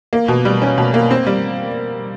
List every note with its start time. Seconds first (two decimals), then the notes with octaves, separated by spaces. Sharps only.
0.13 A#3
0.28 B2
0.45 G3
0.62 C#4
0.78 B2
0.94 A#3
1.11 C4
1.27 G3